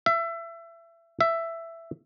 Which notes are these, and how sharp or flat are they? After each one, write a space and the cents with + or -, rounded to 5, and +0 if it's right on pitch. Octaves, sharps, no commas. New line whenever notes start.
E5 +25
E5 +10